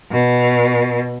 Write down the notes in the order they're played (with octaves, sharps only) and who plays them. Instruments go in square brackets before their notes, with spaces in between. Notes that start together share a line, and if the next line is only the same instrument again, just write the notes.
[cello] B2